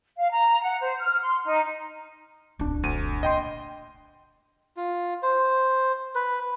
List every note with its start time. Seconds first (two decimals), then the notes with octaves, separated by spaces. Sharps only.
0.17 F5
0.32 A#5
0.63 F#5
0.83 C5
1.00 F6
1.22 C6
1.45 D#4
2.59 D1 C2 F2 D4
2.83 D2 D#7
3.23 A#2 D#5 G5 C6
4.77 F4
5.23 C5
6.15 B4